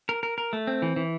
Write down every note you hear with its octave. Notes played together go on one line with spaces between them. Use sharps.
A#4
A#4
A#4
A3
C4
E3
E3